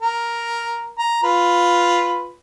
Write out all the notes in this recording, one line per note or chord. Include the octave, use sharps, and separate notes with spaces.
A#4
A#5
F4 B4